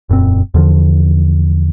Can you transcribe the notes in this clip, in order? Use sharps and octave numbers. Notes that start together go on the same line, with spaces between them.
E1 F#2 A#2 C4
E2 D3 F3